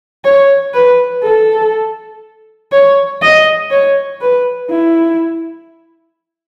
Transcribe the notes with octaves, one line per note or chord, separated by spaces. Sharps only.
C#5
B4
A4
C#5
D#5
C#5
B4
E4